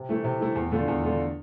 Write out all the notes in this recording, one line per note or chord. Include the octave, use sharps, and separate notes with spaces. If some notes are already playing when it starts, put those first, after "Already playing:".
Already playing: C3
E3 A3 E4
C3
E3 A3 E4
E2
D3 A3 D4 F4
E2
D3 A3 D4 F4